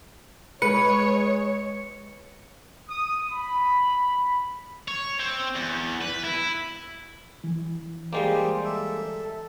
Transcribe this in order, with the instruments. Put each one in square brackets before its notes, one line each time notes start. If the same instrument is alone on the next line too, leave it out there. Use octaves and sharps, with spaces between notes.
[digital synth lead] G#3 [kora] B4 [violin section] C#5 [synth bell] C#7
[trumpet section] D#6
B5
[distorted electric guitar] C#5
C4
E2
B4
E4
[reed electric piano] E3
[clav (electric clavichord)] G3 G#3 A#3 [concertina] G4 C5 D5
[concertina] A4 E5